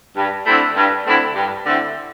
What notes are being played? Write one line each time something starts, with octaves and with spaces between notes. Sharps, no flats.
G2
D3 A3 C4 E4
G2
D3 A3 C4 E4
G2
D3 A3 C4 E4